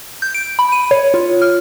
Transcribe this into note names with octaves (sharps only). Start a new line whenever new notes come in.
G6
D7
B5
D#7
C#5
F4
F6